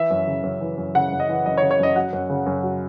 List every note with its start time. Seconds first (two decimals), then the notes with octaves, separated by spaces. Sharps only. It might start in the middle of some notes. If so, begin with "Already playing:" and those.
Already playing: E3 E5
0.10 F#2
0.27 C#3
0.43 F#2
0.61 E3
0.78 F#2
0.95 C#3 F#5
1.12 F#2
1.20 D#5
1.29 E3
1.46 F#2 D#5
1.57 C#5
1.62 C#3
1.71 C#5
1.79 F#2 D#5
1.96 F#3 F#5
2.13 F#2
2.29 C#3
2.46 F#2
2.63 F#3